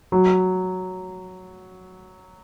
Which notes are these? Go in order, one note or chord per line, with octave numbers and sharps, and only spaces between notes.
F#3